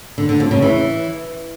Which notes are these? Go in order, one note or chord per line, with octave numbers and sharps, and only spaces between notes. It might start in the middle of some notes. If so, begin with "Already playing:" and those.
D3
D3
F2
C#3
E3